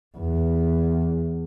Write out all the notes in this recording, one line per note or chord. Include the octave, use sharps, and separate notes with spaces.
E2